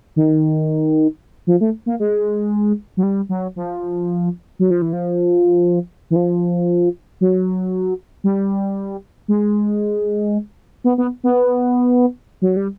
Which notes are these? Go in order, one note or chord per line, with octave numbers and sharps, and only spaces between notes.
D#3
F3
A3
A#3
G#3
F#3
G3
F#3
F3
F#3
F3
E3
F3
E3
F3
F#3
G3
G#3
B3
B3
B3
F#3
G3